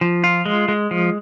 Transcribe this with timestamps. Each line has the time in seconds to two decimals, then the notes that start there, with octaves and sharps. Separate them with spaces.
0.01 F3
0.24 F4
0.46 G#3
0.68 G#3
0.91 F3